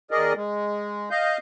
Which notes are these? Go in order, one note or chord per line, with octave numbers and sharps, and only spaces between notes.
D#2 G#4 A#4 D5 D#5
G#3
D#5 F5 G6